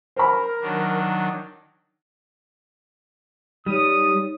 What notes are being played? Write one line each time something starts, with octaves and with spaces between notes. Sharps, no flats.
A#4 C5 B5
D#3 F#3 D4
G3 D#4 C#5 D#6